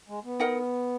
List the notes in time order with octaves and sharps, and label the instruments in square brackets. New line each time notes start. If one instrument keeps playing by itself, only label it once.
[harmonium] G#3
B3
[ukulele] D#4 A#4 D#5 F#5